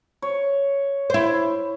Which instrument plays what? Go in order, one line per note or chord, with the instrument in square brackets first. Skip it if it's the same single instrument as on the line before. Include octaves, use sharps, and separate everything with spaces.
[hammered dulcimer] C#5
[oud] E4 C5